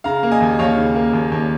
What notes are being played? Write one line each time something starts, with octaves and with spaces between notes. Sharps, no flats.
C#3 F5 A#5
A#3
D#5 G#5
D#2
D#2 C#5 F5
C#3
A#3
D#2
D#2